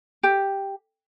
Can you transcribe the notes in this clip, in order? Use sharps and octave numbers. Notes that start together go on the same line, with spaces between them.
G4